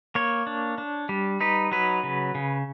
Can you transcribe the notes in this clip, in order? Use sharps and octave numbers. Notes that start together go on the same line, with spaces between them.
A#3 C#5
D4
D4
G3
D#4 B4
F#3 B4
C#3
C#3